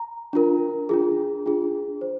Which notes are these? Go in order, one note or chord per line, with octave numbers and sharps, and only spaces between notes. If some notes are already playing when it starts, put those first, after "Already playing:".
Already playing: A#5
D4 F4 A#4
D4 F4 G#4
D4 F4 G#4
C5